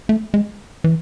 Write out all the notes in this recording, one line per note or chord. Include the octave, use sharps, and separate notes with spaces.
A3
G#3
E3